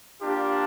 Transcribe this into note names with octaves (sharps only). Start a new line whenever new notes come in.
A#3 D4 F4 G4